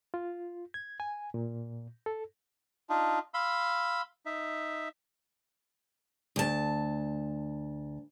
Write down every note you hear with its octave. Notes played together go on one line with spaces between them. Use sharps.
F4
G#6
G#5
A#2
A4
D4 D#4 F4
F5 B5 C6 E6
D#4 E5
D2 A5